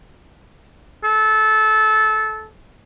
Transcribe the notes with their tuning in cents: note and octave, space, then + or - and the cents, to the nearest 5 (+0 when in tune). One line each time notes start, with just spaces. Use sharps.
A4 -20